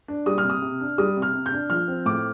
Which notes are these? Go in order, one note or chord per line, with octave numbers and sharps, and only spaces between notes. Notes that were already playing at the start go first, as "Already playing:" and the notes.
D4
G3 D#6
F6
C3
D#6
C3
D4
G3 D#6
C3
F6
C3
G6
D4
F3 F6
C4
A2 D6